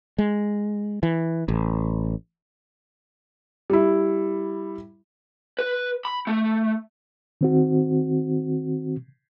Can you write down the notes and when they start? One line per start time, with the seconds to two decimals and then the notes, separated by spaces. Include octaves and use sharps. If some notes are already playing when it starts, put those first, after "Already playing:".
0.18 G#3
1.03 E3
1.48 A1
3.70 G3 E4
5.59 B4
6.05 B5
6.27 A3
7.41 D#3 C4 F#4